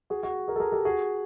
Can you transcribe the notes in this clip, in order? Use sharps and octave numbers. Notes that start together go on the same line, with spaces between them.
F#4 G#4
F#4 G#4
G#4 A#4
A4
G#4 A#4
G4 A4
F#4 G#4